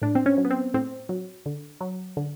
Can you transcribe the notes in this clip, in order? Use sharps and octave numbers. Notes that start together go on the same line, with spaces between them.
A2 D4
C4
C#4
F#3
B3
C4
A2 C4
F#3
D3
F#3
D3